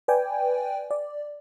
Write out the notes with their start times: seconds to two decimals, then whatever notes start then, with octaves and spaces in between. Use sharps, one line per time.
0.08 B4 D5 G5 G#5
0.91 D5